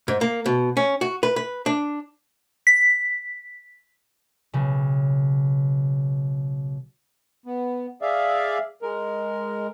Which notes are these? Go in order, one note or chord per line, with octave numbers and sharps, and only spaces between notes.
G#2
A#3
B2
C#4
F#4
B4
B4
D4
B6
B1 C#3
B3
G#4 D5 E5 F5
G#3 A#4